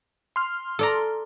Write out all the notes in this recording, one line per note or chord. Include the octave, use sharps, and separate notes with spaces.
C6 F6
A4 D5 A#5